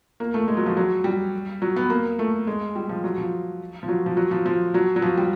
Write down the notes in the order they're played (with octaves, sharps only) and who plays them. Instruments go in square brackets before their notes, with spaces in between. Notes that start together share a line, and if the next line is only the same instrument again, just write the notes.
[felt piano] A#3
A3
G#3
F#3
F3
F#3
G3
F#3
B3
A#3
A3
G#3
G3
F3
F#3
F3
F3
F#3
F3
F#3
F3
F3
F#3
F#3
F3
G3